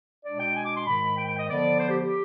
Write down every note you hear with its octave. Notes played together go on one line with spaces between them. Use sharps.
B2 G#3 D4 D5
G5
G#5
D6
C6
G#2 D#3 G#3 B5
G5
G5
D#5
D3 F3 B3 D5
C5
G4
G4